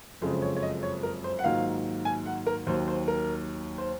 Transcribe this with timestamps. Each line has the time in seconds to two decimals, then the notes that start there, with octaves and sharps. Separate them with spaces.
0.21 F#1 F2 C#3 G#3 C4 C5
0.42 C#5
0.56 C#5
0.63 D#5
0.83 C#5
1.03 A#4
1.24 C5
1.39 F#5
1.44 G#2 D#3 F#3 A#3 F4 F5
2.05 G#5
2.26 F#5
2.47 A#4
2.67 D#2 D#3 F#3 C5
2.88 C5
3.08 A#4
3.78 C5